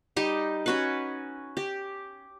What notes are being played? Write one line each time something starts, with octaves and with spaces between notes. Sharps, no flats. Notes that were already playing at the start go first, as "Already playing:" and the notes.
G3 D#4 G4 D#5
C#4 F#4 B4
G4